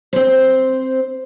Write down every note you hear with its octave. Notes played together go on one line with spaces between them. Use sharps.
C4 C5